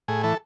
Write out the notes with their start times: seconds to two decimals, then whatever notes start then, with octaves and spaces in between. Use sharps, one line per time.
0.08 A2 G#4
0.24 E3 A4